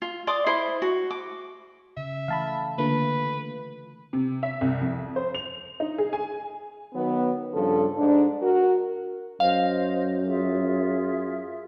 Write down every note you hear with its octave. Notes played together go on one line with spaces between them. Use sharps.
F4
D5 C6 D6 D#6
E4 C5 C6
F#4
D6
C#3 E5
E3 A3 F5 A5 B5
D3 A3 A#3 F4 B4
C3
E5
C2
F2
C5
F7
D#4
G#4
G#5
D#3 F#3 B3
G2 C#3 F3 A4
G#2 D4
F#4 A#4
F#2 C5 D#5 F5
F4 G#4 E5